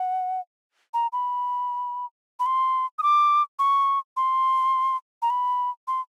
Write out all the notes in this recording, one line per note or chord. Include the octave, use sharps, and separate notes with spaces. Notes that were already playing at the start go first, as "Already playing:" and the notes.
Already playing: F#5
A#5
B5
B5
C6
D#6
D6
C#6
C6
A#5
B5
C6